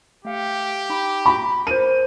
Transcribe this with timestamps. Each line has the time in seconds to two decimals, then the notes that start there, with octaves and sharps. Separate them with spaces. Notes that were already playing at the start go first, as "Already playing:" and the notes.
0.25 A3 G4 F5 C#7
0.90 D#4 B5 D6
1.26 B5 A#6
1.67 A#4 C5 D#7